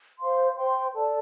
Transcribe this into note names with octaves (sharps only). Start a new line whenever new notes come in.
C5 F5 C6
C5 G5 C6
A4 D5 A5